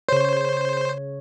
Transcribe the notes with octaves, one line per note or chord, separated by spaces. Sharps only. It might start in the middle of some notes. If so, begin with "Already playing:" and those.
C#3 C5 C#5